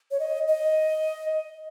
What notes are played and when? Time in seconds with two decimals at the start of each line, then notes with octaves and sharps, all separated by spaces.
0.11 C#5
0.20 D#5
0.48 D#5